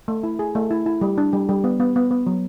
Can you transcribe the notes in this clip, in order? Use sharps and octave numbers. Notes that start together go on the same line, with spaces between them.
A3
E4
G#4
A3
E4
E4
G3
D4
G3
G3
B3
B3
B3
B3
F#3